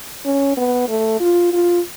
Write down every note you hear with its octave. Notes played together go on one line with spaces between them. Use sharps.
C#4
B3
A3
F4
F4